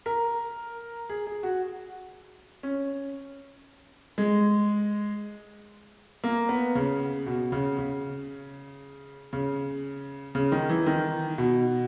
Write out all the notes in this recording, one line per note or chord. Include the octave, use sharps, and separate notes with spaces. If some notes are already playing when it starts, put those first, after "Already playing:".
A#4
G#4
G#4
F#4
C#4
G#3
A#3
B3
C#3
B2
C#3
C#3
C#3
C#3
D#3
E3
D#3
B2